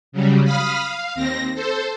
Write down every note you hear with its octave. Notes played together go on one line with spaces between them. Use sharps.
C#3 F#3 G3
F5 B5 D#6 F6
F5
D#2 C4 A#6
A4 C5